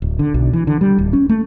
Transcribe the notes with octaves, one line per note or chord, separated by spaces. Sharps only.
D1
D3
B1
E3
D3
G3
D1
C#4
A3